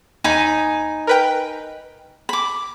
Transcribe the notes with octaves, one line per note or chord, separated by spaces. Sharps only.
D#2 D#4 G#5 B5
A#4 B4 G5
B5 D6